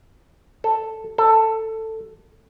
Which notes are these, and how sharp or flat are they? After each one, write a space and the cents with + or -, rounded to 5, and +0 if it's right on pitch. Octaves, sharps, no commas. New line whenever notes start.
A4 +0
A4 +10